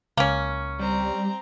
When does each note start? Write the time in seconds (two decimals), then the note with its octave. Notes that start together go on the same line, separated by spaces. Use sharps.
0.17 C#2 A#3 C#4
0.79 G3 C4 A#5